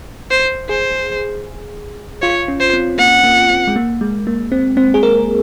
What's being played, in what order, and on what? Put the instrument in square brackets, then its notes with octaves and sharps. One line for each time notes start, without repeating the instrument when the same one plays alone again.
[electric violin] C5
[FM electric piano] G#4 [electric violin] C5
[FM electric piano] F4 [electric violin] C#5
[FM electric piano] C#4
[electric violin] C5
[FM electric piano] C4
[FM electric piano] A#3 [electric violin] F#5
[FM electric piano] A#3
C4
G#3
A#3
G#3
A#3
C4
C4
G#4
A#4